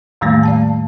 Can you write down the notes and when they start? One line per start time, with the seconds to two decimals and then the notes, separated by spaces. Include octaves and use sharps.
0.21 E2 A2 D#3 G3 A3 A#3
0.43 D5 F5 A5